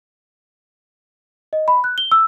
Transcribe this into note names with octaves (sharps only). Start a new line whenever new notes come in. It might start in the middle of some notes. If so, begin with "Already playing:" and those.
D#5
B5
F#6
G7
E6